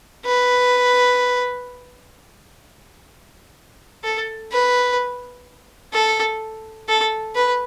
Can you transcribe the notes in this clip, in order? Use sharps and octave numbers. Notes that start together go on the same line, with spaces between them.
B4
A4
B4
A4
A4
B4